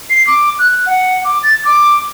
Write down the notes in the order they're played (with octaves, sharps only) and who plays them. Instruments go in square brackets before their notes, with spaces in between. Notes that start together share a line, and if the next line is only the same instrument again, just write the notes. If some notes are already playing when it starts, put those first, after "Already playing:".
[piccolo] C7
D6
F#6
F#5
D6
A6
D6